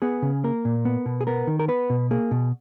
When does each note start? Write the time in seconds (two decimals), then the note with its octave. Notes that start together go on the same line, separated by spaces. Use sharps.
0.02 B3 G#4
0.22 C#3
0.44 A#3 A#4
0.65 A#2
0.85 B3
1.06 B2
1.21 G#4
1.27 B3 A#4
1.47 D#3
1.59 A#4
1.68 B3 B4
1.90 B2
2.11 A#3 G#4
2.31 B2